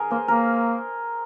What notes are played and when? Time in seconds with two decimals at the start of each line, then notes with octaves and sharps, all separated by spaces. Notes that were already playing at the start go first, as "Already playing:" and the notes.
Already playing: G#4 A#4
0.11 A#3 C5
0.28 A#3 A#4